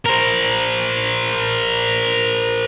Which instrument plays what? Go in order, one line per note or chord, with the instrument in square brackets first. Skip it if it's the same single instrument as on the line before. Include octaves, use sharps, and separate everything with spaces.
[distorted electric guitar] A#4 C5